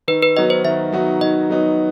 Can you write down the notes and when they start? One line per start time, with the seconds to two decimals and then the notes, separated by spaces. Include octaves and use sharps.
0.08 D#3 B4
0.22 B4
0.36 F#3 B3 D#4 F#4 D#5
0.50 C5
0.64 D#3 E5
0.92 F#3 B3 D#4 F#4
1.21 D#3 D#5
1.50 F#3 B3 D#4 F#4